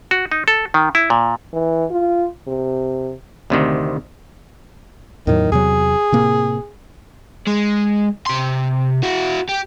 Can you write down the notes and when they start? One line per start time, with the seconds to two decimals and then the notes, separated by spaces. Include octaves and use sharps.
0.11 F#4
0.32 D#4
0.48 A4
0.74 D#3
0.95 E4
1.10 A#2
1.54 E3
1.91 F4
2.48 C3
3.50 D2 C3 D#3
5.27 E2 A2 D#3 F#3
5.52 E2 C3 F#3 G#4
6.12 A2 C3 A#3
7.47 G#3
8.26 C3 C6
9.03 E4 F#4
9.49 G4